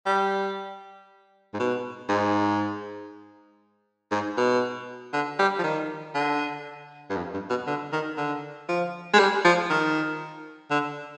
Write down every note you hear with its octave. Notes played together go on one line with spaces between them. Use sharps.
G3
G#2
B2
G#2
G#2
B2
D3
G3
F3
D#3
D3
G2
F2
G2
B2
D3
D#3
D3
F3
G#3
G3
F3
D#3
D3